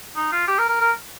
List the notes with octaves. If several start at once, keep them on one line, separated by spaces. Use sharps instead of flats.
D#4
F4
G4
A#4
A#4
A#4